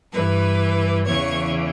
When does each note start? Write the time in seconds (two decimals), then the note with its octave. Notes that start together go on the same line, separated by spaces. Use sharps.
0.12 G2 E3 B4
1.06 E2 C#3 E3 C#5